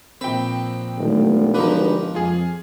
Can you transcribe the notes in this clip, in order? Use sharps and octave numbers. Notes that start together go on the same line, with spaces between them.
A#1 C4 B4 G5
E1 B1 D#3 A3
G1 C#2 F3 A#3 D#4 B4
F2 F4 G#4